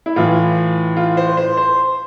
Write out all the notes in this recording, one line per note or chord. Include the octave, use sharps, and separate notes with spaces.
E4
A2 E3 F4
F4
C5
C5
C5